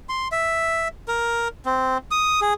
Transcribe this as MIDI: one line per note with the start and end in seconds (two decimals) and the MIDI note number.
0.09 0.28 84
0.32 0.88 76
1.08 1.48 70
1.65 1.98 60
2.11 2.40 87
2.41 2.54 68